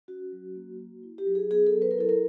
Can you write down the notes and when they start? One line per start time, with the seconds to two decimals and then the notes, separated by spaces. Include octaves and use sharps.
0.08 C#4 F#4
0.32 F#3
0.55 A#3
0.79 F#4
1.03 E4
1.18 G4
1.27 F#3
1.35 G#4
1.51 B3 G#4
1.67 A4
1.74 F#3
1.82 B4
1.91 A#4
1.98 E4 A4
2.09 A#4